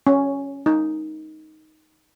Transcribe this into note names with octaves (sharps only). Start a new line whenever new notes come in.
C#4
D#4